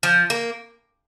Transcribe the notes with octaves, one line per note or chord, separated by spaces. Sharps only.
F3
A#3